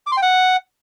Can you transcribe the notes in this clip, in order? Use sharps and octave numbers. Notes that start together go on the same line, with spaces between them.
D6
C6
G5
F#5